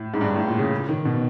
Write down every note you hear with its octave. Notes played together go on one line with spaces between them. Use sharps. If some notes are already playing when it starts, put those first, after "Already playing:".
Already playing: A2
G#2
G2
A2
A#2
C#3
D#3
B2